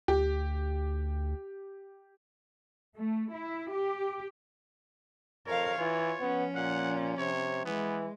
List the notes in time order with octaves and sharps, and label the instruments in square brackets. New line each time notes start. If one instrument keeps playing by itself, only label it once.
[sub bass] D2 [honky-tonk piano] G4
[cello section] A3
E4
G4
[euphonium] F2 [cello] A#4 F5 [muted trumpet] C#5
[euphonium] E3 [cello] F4
[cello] F3 C#4 [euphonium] B3
[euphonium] A#2 [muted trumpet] F#5
[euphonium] C3 [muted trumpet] C#5
[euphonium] E3 [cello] G#3 [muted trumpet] B3